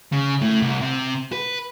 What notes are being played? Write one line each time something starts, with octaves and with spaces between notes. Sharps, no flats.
C#3
A2
C2
C3
B4